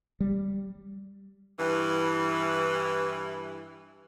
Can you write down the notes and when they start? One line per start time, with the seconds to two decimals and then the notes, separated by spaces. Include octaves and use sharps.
0.20 G3
1.59 G2 E3